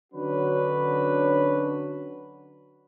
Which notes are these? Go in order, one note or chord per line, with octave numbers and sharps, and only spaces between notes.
D3 F#3 C#4 D4 F#4 B4